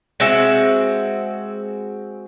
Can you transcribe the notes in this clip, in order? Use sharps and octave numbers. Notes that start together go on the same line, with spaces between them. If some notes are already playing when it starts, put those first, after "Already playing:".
G#3 C4 F#4 E5